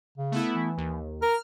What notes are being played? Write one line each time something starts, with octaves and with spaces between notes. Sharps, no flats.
C#3
A3 B3 E4
E3
D#2
A#4 F6